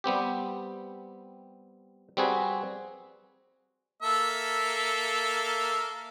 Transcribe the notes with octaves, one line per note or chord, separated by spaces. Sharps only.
G3 B3 C4 G4
G3 C4 F#4 G#4 B4
A#3 A4 E5